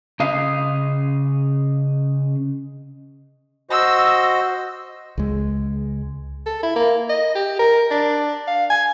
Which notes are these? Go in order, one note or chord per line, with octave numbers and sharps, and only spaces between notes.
C#3 D#5 F5
F#4 C5 D#5 E6
C#2 G#3
A4
E4
A#3
D#5
G4
A#4
D4
F5
G#5